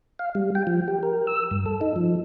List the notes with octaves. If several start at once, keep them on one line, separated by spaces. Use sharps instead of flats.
F5
G3
G5
F3
G4
A#4
E6
G2
A4
D#4
F3